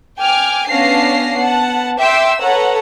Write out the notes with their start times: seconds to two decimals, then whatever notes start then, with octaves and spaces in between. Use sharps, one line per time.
0.19 G5 G#5 D6 F6
0.70 B3 C#4 D4 F5 A#6 C7
1.36 B3 F#5 A5
1.99 E5 G5 C6 D6 E6
2.41 A4 B4 C#5 F#5 A#5